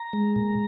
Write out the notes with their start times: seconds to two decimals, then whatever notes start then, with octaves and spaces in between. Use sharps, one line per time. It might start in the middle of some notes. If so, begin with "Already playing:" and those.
Already playing: A#5
0.13 G#3
0.36 A#2